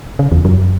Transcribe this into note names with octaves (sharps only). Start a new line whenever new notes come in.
C#3
E2
F#2